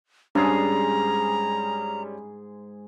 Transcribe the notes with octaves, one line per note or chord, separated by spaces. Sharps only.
G#2 G3 C#4 D4 G#4 A#5